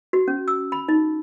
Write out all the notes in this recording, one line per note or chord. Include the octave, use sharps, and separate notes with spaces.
F#4
C#4
E6
B5
D#4